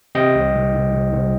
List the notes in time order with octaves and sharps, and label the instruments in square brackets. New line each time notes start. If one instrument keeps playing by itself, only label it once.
[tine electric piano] C3 D#5 G5
C2
C2
C2
C2
C2